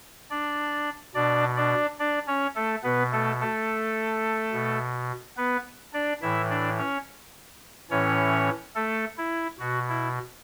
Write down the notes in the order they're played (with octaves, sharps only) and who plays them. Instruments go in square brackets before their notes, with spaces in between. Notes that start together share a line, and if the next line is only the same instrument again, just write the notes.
[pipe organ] D4 D5
B2 D4 D5
D4 D5
D4 D5
C#4 C#5
A3 A4
B2 B3 B4
A3 A4
A3 A4
B2
B3 B4
D4 D5
A2 E3 E4 E5
D4 D5
C#4 C#5
A2 E3 C#4 C#5
A3 A4
E4
B2 F#4
E4